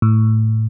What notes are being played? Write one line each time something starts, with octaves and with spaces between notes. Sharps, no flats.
A2